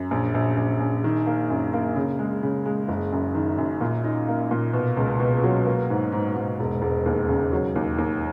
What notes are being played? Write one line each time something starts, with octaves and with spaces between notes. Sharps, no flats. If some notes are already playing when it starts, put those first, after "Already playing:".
Already playing: F#2
A#1
A#1
A#1
A#1
D#3
A#3
F#2
A#3
C#3
G#3
C#3
G#3
F#1
F#2
D#3
F#2
A#2
D#4
A#3
A#2
B2
C#2
B2
F#3
A#3
G#2
G#2
G#2
E1
E1
D#2
C#3
F#3
D#2
D#2